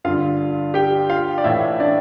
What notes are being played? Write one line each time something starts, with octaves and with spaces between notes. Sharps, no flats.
G2 D3 F4 F5
G4 G5
F4 F5
D5
A2 E3 E4 E5
D4 D5